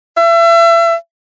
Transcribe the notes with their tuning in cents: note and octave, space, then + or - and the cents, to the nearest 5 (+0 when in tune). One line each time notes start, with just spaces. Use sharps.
E5 +35